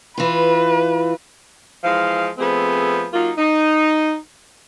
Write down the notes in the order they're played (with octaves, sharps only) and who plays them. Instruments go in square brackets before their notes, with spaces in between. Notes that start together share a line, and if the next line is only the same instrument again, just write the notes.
[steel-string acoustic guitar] E3 F4 [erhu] B4
[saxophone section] E3 F3 G#3 F5
F3 A3 B3 C4 G#4
F#3 A#3 D#4 F4
D#4